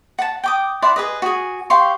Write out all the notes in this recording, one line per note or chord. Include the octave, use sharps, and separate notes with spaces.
F#5 A5
G5 D6 D#6
E4 D5 F#5 C6
G#4 B4 D#5
F#4 G#4
G4 F5 C6 C#6